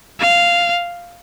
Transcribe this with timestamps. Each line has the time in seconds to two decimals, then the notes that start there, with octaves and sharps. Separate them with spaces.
0.20 F5